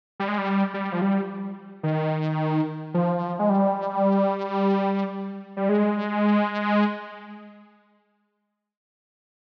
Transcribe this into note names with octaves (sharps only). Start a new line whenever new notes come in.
G3
G#3
G3
G3
F3
G3
D#3
F3
G#3
G3
G3
G#3